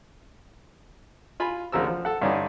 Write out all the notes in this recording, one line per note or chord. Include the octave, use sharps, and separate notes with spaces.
F4 G#5 B5
D2 C#3 F3 A#4 E6
F3
A4 F#5
G2 D3 C#4 D#4 D5 G#5